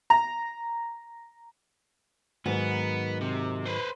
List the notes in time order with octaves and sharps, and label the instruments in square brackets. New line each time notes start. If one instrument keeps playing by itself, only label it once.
[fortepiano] A#5
[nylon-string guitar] G#2 D#3 F#3 [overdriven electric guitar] B3
[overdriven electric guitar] C3
B4 C5